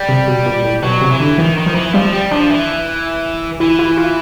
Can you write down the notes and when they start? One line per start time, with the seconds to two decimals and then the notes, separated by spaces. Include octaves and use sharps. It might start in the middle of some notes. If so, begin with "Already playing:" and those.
Already playing: G3
0.09 C3
0.28 B2
0.46 A#2
0.65 A2
0.83 B2 F#3
1.01 C3
1.11 E3
1.20 D3
1.38 D#3 E3
1.57 D#3
1.66 F3
1.75 E3
1.94 F3 G3
2.12 G3
2.31 F3 D4
2.50 E3
3.60 E3 E4
3.79 E4
3.97 F4